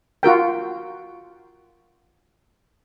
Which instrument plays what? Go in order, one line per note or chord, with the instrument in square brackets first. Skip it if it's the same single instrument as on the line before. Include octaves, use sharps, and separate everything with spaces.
[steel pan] F4 F#4 A#4 G5